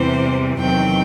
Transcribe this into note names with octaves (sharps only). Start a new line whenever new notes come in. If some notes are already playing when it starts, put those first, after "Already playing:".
Already playing: E2 C3 E3 G3 C5
E2 C3 D#3 F#3 C4 G5